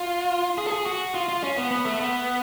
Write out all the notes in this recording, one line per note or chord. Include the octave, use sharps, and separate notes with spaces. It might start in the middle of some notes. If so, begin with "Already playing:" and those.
Already playing: F4
G#4
A4
G#4
F#4
F4
F4
C#4
B3
B3
A3
B3